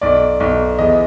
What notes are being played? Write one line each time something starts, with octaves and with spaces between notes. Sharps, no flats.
B1 D5
B1
E2 D#5